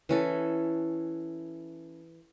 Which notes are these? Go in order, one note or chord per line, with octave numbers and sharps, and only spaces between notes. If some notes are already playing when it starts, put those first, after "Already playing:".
E3 C#4 A4